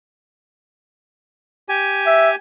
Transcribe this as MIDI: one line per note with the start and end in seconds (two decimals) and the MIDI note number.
1.69 2.35 67
1.69 2.35 80
2.06 2.30 76